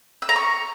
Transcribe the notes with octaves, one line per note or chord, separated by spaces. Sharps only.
E6
A#5
C#6